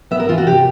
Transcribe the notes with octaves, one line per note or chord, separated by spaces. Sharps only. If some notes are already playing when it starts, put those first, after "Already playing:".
B3 E5
A#4
E3 F4
F#4
C3 G4